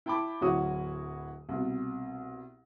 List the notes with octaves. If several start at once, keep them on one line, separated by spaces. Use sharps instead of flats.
E4 G5 A5 B5 D6
D1 F#3 E4 F#4 C#5 D#6
C2 B2